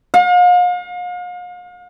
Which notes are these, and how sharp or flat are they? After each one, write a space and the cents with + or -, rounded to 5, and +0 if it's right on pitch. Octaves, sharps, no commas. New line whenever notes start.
F5 +40